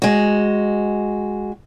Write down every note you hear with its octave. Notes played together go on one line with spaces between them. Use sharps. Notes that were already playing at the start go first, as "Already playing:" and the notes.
G#3 F#4